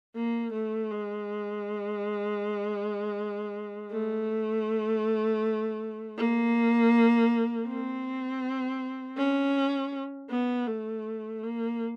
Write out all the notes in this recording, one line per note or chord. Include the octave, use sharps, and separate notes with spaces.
A#3
A3
G#3
A3
A#3
C4
C#4
B3
A3
A#3